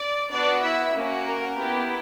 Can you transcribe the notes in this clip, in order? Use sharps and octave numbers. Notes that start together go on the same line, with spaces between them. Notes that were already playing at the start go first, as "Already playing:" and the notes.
Already playing: D5
B3 D4 F#4 D5
E4 E5
A#3 C#4 F#4
A#4
B3 E4 G4